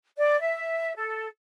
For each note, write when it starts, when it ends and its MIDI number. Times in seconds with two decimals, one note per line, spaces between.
0.18 0.39 74
0.41 0.93 76
0.97 1.26 69